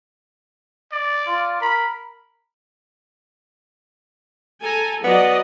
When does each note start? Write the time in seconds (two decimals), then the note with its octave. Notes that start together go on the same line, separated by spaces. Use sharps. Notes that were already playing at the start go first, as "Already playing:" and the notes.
0.93 D5
1.27 F4
1.61 A#4 B5
4.63 A4 G#5 A#5
5.04 F#3 B3 D5 D#5